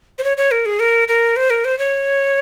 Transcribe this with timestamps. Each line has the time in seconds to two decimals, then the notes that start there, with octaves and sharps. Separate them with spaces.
0.18 C5
0.24 C#5
0.37 C#5
0.51 A#4
0.66 G#4
0.80 A#4
1.08 A#4
1.36 C5
1.50 A#4
1.65 C5
1.79 C#5